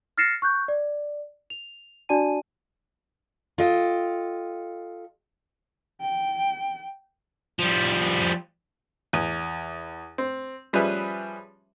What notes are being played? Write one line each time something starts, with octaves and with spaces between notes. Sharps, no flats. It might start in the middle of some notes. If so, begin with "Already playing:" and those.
F6 A6 A#6 C7 C#7 E7
C#6 F#6 G6
D5
F7
D4 F#4 D5 G#5 A5 D#7
F4 A4 D#5 G5
G5
F3 G3
E2
C4
F3 G3 C#4 G#4 B4 E5